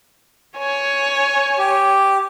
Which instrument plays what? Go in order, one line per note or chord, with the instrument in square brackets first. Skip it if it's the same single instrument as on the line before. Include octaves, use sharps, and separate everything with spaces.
[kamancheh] C#5 G#5
[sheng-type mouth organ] G4